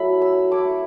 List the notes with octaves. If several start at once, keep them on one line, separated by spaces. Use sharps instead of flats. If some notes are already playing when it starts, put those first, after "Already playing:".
Already playing: F#3 A3 E4 B5
E6
A3 E4 D6